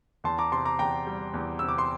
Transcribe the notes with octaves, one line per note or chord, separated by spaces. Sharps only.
E2 A5 C6
A#5 D6
C3 A5 C6
A#5 D6
E2 G5 A#5
G3
E2
C3 E6
D6
C6